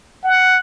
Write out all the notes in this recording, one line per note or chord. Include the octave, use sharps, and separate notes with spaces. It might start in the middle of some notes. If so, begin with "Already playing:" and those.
F#5